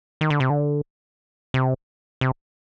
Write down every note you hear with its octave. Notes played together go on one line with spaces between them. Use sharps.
D#3
D3
C3
D3
C3
C3